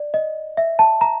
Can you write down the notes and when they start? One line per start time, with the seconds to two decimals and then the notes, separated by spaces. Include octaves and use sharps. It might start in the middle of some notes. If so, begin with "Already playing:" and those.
Already playing: D5
0.14 D#5
0.57 E5
0.79 A5
1.01 A#5